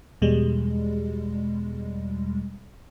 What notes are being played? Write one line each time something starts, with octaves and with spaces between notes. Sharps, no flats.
E2 B2 G3 G#3